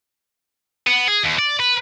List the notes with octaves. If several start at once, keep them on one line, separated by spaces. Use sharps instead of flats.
B3
G#4
D#2
D5
B4